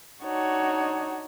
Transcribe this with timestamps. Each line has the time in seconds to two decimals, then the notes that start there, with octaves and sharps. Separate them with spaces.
0.23 D4 D#4 F#4 C#5